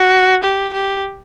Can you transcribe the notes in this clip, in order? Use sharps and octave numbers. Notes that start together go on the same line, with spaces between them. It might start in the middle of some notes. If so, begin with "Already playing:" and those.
Already playing: F#4
G4
G4